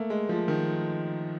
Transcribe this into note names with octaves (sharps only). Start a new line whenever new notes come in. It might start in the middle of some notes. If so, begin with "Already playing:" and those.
Already playing: A3 A#3
G#3
F3
D#3